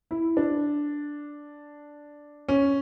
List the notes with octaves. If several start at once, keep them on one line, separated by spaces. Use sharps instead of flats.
E4
D4
C#4